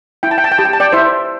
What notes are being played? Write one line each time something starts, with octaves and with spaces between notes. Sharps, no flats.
E4 G5
A5
G5
A5
G5
G4 A5
G5
A5
D5 G5
E4 C5 E5